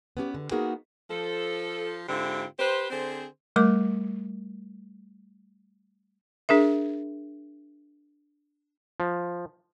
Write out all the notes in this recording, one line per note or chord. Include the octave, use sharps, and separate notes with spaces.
B3 C#4 G4
D3
A#3 B3 D#4 F#4 G#4 A#4
F3 A4
G#2 D3 C4 E4 F4 G4
G4 B4 C5
D3 C4 G#4 C5
G3 A3 A#4 D6
D4 G#4 A#4 E5
F3